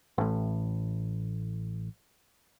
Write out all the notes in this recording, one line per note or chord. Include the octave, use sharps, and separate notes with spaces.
A1 A2